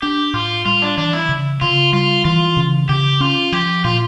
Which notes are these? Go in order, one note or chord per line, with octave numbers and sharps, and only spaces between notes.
D4 G4
A2 F4
G3 F4
D4
E3 D4
E4
C#3
C#3 F4
G3 F4
E3 F4
C#3
C#3 G4
C#4 F4
F3 G4
A#2 F4